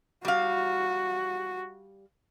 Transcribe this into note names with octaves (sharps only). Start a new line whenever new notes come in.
G3 F#4 F5